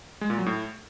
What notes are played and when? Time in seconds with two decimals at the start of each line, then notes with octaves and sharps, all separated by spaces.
0.21 G#3
0.30 A#2
0.38 F#3
0.46 A2